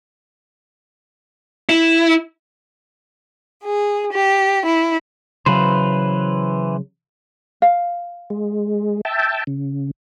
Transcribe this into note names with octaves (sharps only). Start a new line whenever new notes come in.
E4
G#4
G4
E4
C#3 E3 F#3 B4 C5
F5
G#3
E5 G5 A5
C#3